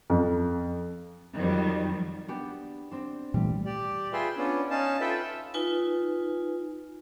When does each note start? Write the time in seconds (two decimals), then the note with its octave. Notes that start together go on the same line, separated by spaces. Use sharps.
0.10 F2
1.34 F2 D#3 F#3 G3
2.28 B3 D4 G4
2.91 C4 D4
3.34 A#2 E3 G3 A3
3.65 G4 D5
4.13 F4 G#4 B4 E5 G5 C6
4.37 B3 C#4 D4 F4
4.70 C#4 D#4 F5 A5
5.01 F4 A4 B4 E5 G5 B5
5.21 E5
5.54 D#4 F4 B4 G#5